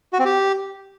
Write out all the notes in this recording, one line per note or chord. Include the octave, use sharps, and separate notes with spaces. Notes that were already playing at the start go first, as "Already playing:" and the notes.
F#4
C4
G4